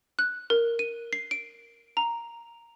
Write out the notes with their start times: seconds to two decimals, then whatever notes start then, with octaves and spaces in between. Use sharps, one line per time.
0.19 F#6
0.50 A#4
0.79 D#7
1.13 C7
1.31 D7
1.97 A#5